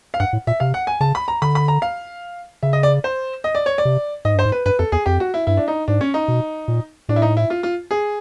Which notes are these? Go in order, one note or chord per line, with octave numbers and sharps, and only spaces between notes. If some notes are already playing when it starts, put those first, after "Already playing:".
F5
G2 F#5
A2
A#2 E5
C3 F5
F#5
G#5
C#3 A5
B5
A#5
D3 B5
B5
A#5
F5
C#3 E5
D#5
D5
C5
D#5
D5
C#5
D5
C3
G#2 D#5
G2 C5
G#2
B4
G2 B4
F2 A4
E2 G#4
F2 G4
F#4
E4
G2 E4
D4
D#4
G#2 D4
C#4
D#4
B2
A#2
A2 D4
E4
D#4
E4
F4
F4
G#4